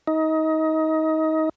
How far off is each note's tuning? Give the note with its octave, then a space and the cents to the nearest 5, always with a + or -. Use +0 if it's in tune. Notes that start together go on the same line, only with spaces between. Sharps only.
D#4 +25